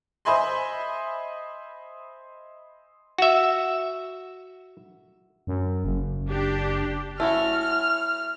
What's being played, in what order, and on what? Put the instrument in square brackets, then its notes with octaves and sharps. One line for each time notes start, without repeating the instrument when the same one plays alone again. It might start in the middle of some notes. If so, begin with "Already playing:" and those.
[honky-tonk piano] C5 D#5 E5 G#5 B5 C6
[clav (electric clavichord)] F#4 E5
[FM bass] F#2
F#1
[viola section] D4 G4
[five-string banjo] A3 C#4 F#4 [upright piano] E4 [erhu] F6